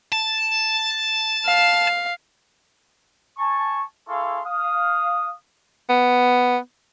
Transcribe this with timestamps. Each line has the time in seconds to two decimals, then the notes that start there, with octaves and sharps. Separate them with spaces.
0.13 A5
1.46 F5
3.37 G#5 A5 C#6
4.08 E4 G#4 A4 F5 C6 C#6
4.45 F5 D#6
5.90 B3